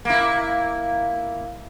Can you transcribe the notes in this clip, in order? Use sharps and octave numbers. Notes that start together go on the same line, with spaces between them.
A#3 E4